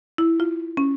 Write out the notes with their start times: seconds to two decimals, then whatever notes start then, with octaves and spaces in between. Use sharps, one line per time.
0.18 E4
0.40 F4
0.77 C#4